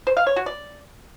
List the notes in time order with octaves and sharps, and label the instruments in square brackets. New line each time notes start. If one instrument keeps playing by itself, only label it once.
[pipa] C5
F5
C#5
F#4
D5